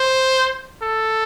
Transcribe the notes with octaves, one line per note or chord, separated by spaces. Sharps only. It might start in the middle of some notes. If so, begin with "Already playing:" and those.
Already playing: C5
A4